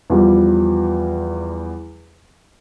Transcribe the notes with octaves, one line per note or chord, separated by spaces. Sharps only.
E2 F3 G3